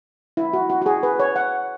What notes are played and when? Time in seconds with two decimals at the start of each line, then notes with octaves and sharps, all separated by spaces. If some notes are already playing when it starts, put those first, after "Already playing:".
0.37 E4
0.53 F#4
0.70 F#4
0.82 F#4
0.86 G#4
1.03 B4
1.20 C#5
1.36 F#5